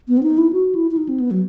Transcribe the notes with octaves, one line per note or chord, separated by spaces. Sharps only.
B3
C4
D#4
E4
F#4
E4
E4
D#4
C4
B3
F#3